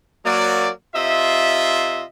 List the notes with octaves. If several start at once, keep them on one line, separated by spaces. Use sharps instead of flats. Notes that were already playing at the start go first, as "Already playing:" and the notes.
F#3 A#3 D5
C3 F4 D#5 E5